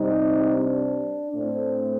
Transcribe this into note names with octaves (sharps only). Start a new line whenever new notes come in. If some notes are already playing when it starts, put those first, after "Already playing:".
Already playing: C3 G3 C4 D#4
D4
A2 A3 C4 D4